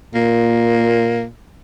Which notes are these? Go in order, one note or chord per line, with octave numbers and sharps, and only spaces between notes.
A#2 A#3